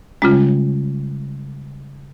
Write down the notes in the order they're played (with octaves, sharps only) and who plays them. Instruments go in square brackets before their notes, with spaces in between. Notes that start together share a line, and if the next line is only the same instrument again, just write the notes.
[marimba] C#3 G3 G#3 [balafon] C#4 F4